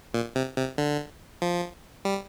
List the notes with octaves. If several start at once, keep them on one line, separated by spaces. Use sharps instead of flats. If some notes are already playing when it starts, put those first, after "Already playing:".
A#2
C3
C3
D3
F3
G3